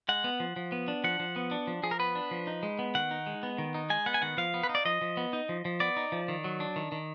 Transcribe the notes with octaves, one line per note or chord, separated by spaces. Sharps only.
G#3 F#5
B3
F3
F3
B3
D4
F3 F#5
F3
B3
D4
F3
F3 G#4
A#4
B3 B4
D4
F3
D#4
G#3
B3
D#3 F#5
D#4
G#3
B3
D#3
D#4
G#3 G#5
B3 F#5
G#5
D#3 F#5
F3 F5
B3
B4
D#4
D5
F3 D#5
F3
B3
D#4
F3
F3
B3 D5
D#4
F3
D#3
F#3
D4
D#3
D#3